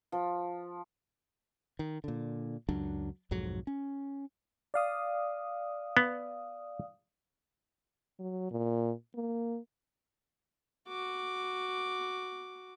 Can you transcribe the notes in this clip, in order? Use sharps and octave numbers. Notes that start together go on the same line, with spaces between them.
F3
D#3
A#2 D3
C#2 F#2 F#3 D4
B1 F2 G#2 F#3
C#4
D5 F5 D#6
B3
F#3
A#2
A#3
F#4 D6